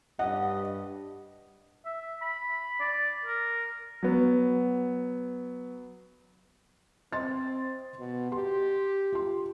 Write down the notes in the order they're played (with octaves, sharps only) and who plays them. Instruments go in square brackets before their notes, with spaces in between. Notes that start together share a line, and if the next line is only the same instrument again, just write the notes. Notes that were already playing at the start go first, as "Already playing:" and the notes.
[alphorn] G2 [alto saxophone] D#5 [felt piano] F#5
[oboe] E5
B5
D5
A#4
[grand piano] F#3 B3
[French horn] C4 [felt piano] D#5 C6 A6
[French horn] B2
[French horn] G4 [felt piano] C6
[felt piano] F4 C6